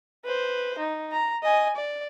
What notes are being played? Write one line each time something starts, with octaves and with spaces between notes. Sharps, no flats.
B4 C5
D#4
A#5
D#5 G#5
D5